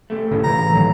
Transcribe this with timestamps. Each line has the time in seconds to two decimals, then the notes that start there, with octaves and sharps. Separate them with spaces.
0.10 C3 A3
0.31 A2 C#3
0.44 A2 E3 A#5
0.74 A2 D#3 F#3